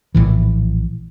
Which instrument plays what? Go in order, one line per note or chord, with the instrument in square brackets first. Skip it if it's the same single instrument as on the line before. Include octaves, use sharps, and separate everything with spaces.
[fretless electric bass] A#1 A2 E3